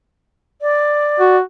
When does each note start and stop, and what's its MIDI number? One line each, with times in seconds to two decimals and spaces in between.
0.62 1.37 74
1.20 1.41 66